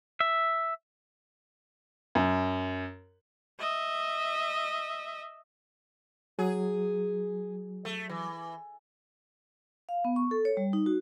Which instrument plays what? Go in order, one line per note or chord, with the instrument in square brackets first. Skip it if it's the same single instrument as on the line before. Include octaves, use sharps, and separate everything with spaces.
[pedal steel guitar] E5
[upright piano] F#2
[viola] D#5 E5
[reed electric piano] F#3 [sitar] G#4
[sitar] A3
E3
[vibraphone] F5
B3
C#6
A4
C#5
G3
D#4
F#4